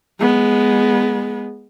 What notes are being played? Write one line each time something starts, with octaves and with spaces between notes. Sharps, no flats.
G#3 B3